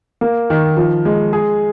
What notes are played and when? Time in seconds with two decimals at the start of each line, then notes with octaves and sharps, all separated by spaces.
0.21 A#3
0.50 D#3
0.77 F3
1.05 G#3
1.33 G#4